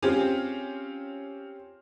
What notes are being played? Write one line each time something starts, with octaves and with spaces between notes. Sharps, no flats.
C4 C#4 F4 G4 G#4